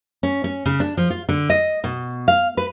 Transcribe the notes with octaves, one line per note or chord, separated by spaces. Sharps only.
C#4
C#4
C#3
D4
F3
F4
D3
D#5
B2
F5
B4